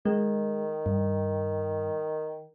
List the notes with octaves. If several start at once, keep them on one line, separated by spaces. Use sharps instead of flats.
D#3 G#3
G2